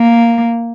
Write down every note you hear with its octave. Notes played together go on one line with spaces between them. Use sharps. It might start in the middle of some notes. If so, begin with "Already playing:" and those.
Already playing: A#3